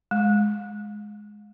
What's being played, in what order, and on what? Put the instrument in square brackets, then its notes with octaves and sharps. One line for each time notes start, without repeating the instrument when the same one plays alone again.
[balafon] G#3